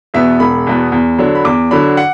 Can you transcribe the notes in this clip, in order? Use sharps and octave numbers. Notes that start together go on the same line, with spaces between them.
E2 B2 B3 E5
E1 B5
E2 B2 B3
E2
D3 F#3 D4
B5
E2 D6
D3 F#3 D4 B5
F#5